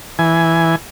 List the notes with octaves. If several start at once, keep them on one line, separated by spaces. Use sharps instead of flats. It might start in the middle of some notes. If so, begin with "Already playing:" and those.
E3 G#5